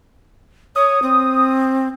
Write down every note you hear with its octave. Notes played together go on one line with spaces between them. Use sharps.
C#5 D#6
C4